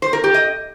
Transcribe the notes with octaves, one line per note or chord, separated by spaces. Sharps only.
C5
A#4
G4
D#5